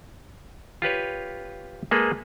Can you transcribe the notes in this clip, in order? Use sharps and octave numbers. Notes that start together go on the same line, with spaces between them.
F4 G4 B4 C#5
G#3 A#3 G#4 A4 B4